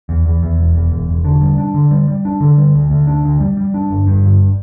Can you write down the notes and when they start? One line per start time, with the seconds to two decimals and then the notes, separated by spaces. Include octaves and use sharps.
0.09 E2
0.26 E2
0.43 E2
0.58 E1
0.75 E2
0.92 E1
1.09 E1
1.25 D3
1.41 G3
1.58 D4
1.74 D3
1.91 G3
2.08 G3
2.25 D4
2.40 D3
2.57 G3
2.75 D2
2.90 D2
3.07 D4
3.24 D2
3.40 G3
3.57 G3
3.74 D4
3.90 G1
4.07 G2
4.23 G1